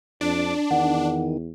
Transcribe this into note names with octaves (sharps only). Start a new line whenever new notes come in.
F2 D4 D6
E2 D#3 F#5